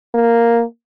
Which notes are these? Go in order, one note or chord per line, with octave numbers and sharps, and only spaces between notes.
A#3